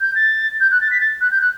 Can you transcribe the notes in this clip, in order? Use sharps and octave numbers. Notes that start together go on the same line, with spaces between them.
G6
A6
G6
F#6
A6
B6
A6
F#6
G6
F#6